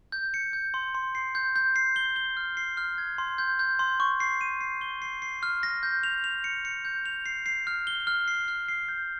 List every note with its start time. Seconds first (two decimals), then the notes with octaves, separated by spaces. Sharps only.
0.12 G6
0.34 C#7
0.53 G6
0.74 C6
0.95 C6
1.15 C7
1.35 G6
1.56 G6
1.76 C7
1.96 G7
2.16 G7
2.37 F6
2.57 C7
2.77 F6
2.98 G#6
3.18 C6
3.38 G6
3.59 G6
3.79 C6
4.00 C#6
4.20 C7
4.41 D#7
4.61 C7
4.81 G7
5.02 C7
5.22 C7
5.43 F6
5.63 A#6
5.83 G6
6.03 F7
6.24 F7
6.44 C#7
6.65 C#7
6.85 G6
7.06 F7
7.26 C7
7.46 C7
7.67 F6
7.87 G7
8.07 F6
8.28 C7
8.48 F6
8.68 C7
8.88 G6